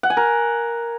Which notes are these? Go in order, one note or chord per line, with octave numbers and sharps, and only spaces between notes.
F#5
G#5
A#4